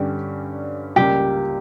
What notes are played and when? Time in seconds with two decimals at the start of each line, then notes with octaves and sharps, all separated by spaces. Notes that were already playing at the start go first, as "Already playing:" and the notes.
Already playing: G2 D3 G3 C#4 G4
0.96 C#2 C#3 G3 A#3 G4